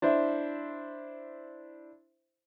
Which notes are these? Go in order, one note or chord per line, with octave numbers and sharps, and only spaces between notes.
D4 E4 C5 E5